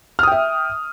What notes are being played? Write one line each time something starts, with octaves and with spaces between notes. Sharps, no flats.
E5 G5 D#6 F6